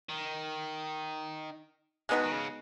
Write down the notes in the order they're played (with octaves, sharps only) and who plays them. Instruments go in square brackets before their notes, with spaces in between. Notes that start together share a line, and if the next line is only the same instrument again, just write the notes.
[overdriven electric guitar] D#3
[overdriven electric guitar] B2 [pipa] G#3 B3 D#4 F#4
[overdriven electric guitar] D#3
C#3